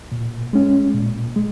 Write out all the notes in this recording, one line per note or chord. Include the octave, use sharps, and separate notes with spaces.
A#2
G#3 C#4
A#2
G#3